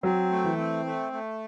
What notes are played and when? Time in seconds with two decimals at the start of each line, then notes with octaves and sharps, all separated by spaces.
0.03 F#3 C4
0.31 A3
0.45 E3
0.58 C4
0.86 A3
1.13 A3